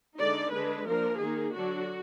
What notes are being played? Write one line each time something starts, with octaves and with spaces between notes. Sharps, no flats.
D3 G#3 D#4 D5
D3 G#3 D4 B4
F3 A#3 D4 A#4
D#3 A#3 D#4 G#4
D3 F#3 D4 F#4